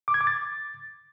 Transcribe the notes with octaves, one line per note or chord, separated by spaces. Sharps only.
D6
G#6
D6
A6